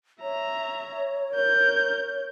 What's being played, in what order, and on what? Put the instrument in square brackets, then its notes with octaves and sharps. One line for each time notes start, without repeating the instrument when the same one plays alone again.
[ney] C#5 [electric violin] E5 A#5
[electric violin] A#4 G6